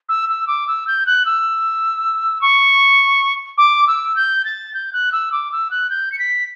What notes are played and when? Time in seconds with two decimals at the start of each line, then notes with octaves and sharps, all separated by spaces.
0.09 E6
0.29 E6
0.47 D6
0.68 E6
0.87 G6
1.06 F#6
1.26 E6
2.41 C#6
3.58 D6
3.87 E6
4.16 G6
4.45 A6
4.74 G6
4.93 F#6
5.12 E6
5.32 D6
5.52 E6
5.71 F#6
5.90 G6
6.12 C#7
6.19 B6